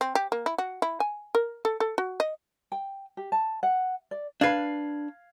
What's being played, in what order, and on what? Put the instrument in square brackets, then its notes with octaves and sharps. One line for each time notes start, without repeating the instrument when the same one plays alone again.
[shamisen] C4
G4
A#3
E4
F#4
E4
G#5
A#4
A4
A4
F#4
D#5
[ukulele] G5
G4
A5
F#5
D5
[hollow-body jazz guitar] D4 B4 [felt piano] F5 G#6 C7